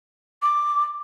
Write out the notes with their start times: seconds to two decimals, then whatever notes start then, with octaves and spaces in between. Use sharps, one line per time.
0.42 D6